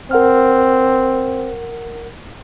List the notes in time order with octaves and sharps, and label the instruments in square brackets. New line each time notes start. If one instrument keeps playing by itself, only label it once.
[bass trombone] C4 [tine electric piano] A#4 F#5 F6